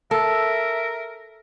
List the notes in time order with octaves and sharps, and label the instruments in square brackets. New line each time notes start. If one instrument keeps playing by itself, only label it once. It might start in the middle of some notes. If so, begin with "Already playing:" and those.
[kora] A4 [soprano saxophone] A#4 [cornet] E5